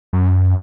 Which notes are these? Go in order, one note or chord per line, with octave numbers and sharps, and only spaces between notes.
F#2